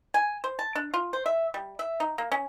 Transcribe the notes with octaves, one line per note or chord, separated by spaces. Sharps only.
G#5
C5
A5
D4
F4
C5
E5
G3
E5
D#4
A#3
C#4